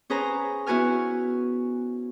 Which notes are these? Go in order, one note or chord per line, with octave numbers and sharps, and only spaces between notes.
C#4 G#4 B4 C5 A#5
B3 E4 F#4 B4 G#5 F6